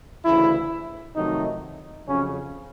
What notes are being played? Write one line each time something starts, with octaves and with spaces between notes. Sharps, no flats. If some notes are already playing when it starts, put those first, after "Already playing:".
D2 C#3 E3 E4
F2 C3 D#3 F#3 A3 D#4
F2 C#3 F#3 C#4